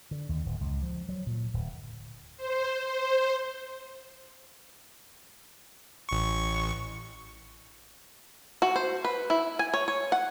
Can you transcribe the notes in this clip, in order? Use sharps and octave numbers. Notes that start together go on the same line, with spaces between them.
D3
D#2
D1
C#2
F3
F#3
A#2
D1
C5
C5
A1 C#6
F#4
C5
B4
E4
G#5
C#5
C#5
F#5